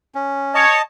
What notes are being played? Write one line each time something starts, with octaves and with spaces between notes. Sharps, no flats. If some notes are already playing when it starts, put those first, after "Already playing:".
C#4
C#5 D#5 A5